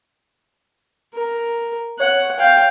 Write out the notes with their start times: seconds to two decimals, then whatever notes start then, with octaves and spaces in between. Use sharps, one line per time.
1.14 A#4
2.00 C#5 F#5
2.39 F5 G5